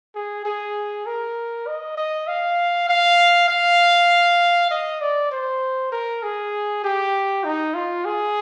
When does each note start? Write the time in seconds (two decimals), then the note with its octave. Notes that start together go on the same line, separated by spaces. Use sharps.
0.15 G#4
0.46 G#4
1.06 A#4
1.67 D#5
1.98 D#5
2.27 F5
2.89 F5
3.49 F5
4.71 D#5
5.01 D5
5.31 C5
5.92 A#4
6.23 G#4
6.84 G4
7.44 D#4
7.74 F4
8.05 G#4